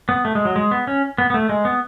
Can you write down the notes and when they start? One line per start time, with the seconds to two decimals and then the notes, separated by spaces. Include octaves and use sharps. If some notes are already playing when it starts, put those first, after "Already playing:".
0.09 B3
0.25 A3
0.35 G#3
0.45 F#3
0.56 G#3
0.71 B3
0.87 C#4
1.18 B3
1.30 B3
1.34 A3
1.49 G#3
1.65 B3